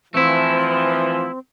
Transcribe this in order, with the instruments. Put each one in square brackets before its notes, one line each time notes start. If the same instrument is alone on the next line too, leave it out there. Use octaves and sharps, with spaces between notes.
[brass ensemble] E3 F3 [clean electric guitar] A3 E4 [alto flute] C4